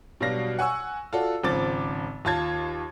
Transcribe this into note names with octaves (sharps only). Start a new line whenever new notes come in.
B2 F#3 G3 D4 F5 A#6
F#5 G#5 C#6 E6
F4 F#4 A4 D5
G#1 C#3 F3 D6 A6
D#2 F4 A5 G#6